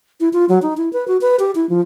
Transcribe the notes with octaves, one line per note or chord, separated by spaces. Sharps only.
E4
F4
F#3
D#4
E4
B4
F#4
B4
G4
E4
F3